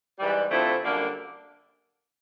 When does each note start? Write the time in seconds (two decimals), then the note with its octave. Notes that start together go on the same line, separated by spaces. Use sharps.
0.19 G#2 E3 G3
0.50 D3 F3 A3 C4 E4
0.82 F#2 D3 G3 A#3